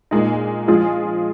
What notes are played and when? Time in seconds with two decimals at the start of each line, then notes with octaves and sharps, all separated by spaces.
0.11 A#2 G#3 D#4
0.68 F3 G#3 F4 G#4